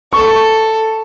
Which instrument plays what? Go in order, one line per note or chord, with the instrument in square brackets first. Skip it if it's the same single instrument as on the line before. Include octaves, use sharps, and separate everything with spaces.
[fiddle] A4 [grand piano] C#6